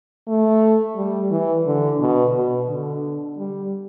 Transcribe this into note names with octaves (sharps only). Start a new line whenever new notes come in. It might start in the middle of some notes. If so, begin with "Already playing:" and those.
A3
G3
E3
D3
B2
B2
D3
G3